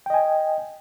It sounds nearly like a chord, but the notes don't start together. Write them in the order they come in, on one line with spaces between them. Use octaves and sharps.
G5 D#5 G#5